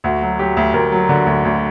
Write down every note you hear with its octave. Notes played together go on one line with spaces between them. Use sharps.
D2 F#4
F#3
F#3 G4
D2
D2 A#4
F#3
D3
D2
D2